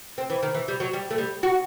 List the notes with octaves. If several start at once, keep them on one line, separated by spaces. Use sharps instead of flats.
C4
E3
D#3
E3
G3
F#3
G3
A3
G3
F#4